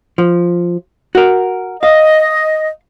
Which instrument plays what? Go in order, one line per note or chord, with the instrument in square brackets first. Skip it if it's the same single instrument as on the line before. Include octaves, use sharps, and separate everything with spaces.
[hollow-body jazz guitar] F3
F#4 A#4
[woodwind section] D#5 [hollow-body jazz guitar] F5